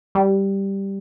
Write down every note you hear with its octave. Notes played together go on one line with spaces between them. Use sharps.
G3